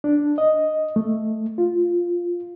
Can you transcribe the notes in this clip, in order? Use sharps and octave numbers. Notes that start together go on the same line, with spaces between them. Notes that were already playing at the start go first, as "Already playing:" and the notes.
D4
D#5
A3
F4